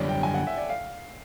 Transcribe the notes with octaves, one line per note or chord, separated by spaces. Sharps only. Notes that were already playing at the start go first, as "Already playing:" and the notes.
Already playing: F#2 D3 G3 C#5 D5
G5
G#5
F#5
E5
D5
F5